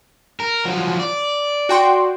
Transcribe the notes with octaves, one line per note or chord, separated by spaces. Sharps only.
A#4
F3 F#3
D5
F#4 G5 C6